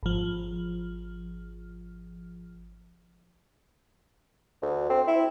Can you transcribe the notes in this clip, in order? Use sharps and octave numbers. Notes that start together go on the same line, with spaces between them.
G#1 F3
D2
C4
E4